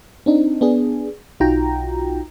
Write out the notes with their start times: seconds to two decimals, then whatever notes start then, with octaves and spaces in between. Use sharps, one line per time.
0.26 C4 D4 D#4
0.61 B3 D4 G#4
1.40 B1 D#4 F4 F#4 G5 A#5